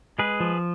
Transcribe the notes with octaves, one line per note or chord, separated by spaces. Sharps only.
G#3 G#4 B4
F3